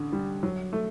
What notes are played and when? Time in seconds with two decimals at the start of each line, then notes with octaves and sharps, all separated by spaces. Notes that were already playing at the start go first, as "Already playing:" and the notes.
Already playing: A1 D3
0.12 G3
0.43 F#3
0.73 A3